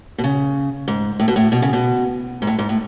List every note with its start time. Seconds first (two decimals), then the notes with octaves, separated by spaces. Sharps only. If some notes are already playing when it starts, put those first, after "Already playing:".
0.18 B2
0.24 C#3
0.88 G#2
1.20 A2
1.28 B2
1.36 A2
1.52 B2
1.62 C#3
1.73 B2
2.42 G#2
2.47 A2
2.59 G#2
2.69 A2